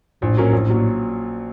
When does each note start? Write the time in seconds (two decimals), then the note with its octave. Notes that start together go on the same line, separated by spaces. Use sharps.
0.21 A#1 A2
0.36 A#2 F#3 A#3 C#4
0.52 A#1
0.68 A#2 F#3